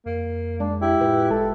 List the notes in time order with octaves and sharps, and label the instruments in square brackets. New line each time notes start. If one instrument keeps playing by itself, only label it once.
[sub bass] F2 [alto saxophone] A#3
[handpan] G#3 [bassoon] D4
[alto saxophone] E4 [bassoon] G4
[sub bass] A2 [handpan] F4 B4
[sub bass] F#1 [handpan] G#3 [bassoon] A4